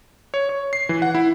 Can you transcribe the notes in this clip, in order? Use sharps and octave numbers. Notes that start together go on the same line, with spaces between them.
C#5
C#5
C7
E3
F#5
E4